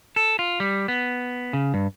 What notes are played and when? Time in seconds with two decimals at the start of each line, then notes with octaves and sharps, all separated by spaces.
0.16 A4
0.39 F4
0.60 G3
0.88 B3
1.53 C#3
1.74 G2